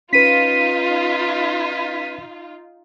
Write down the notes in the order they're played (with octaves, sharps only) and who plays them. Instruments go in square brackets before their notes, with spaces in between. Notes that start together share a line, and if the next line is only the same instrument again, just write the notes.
[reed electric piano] C#4 B4 [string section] D#4 F4 [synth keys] B6 D#7